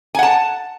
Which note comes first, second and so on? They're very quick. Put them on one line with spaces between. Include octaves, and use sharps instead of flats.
G#5 F#5 A5